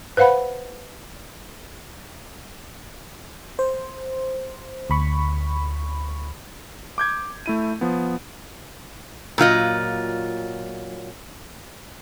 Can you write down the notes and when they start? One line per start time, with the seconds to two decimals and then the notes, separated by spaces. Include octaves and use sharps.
0.17 B4 C5 F5 F#5 B5
3.59 C5
4.90 D2 B5 C#6
6.98 D6 G6 G#6
7.46 A3 E4 D#7
7.81 F3 B3
9.38 A#2 F#3 F4 D#5